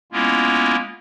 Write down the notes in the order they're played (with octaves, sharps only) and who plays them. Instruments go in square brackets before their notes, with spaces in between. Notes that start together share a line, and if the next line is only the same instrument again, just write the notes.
[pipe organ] G#3 A#3 B3 C#4 E4 F4